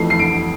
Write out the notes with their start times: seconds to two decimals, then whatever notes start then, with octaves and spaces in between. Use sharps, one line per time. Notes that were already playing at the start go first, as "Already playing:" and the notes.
Already playing: F2 E3 A3 C7
0.10 C7
0.19 D7